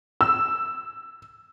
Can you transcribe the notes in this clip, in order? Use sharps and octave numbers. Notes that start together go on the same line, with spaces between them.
E6